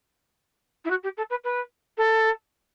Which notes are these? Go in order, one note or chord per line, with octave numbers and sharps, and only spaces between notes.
E4
F#4
G4
A4
B4
B4
A4